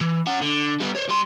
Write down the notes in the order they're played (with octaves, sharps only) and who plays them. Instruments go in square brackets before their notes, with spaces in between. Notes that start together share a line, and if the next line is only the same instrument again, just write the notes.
[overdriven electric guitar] E3
C#4 F#5
D3
G3 B3
C5 C#5
G3 C6